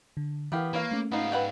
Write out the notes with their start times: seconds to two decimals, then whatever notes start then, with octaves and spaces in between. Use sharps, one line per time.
0.17 D3
0.52 E3 B3 E4 G4 A#4 F5
0.73 A#3 B4 C#5 F5
0.91 A3 C#4
1.12 G#2 B3 D#4 F5
1.32 B4 F#5 G5